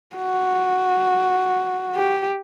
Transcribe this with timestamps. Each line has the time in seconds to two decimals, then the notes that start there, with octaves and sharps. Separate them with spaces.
0.16 F#4
1.95 G4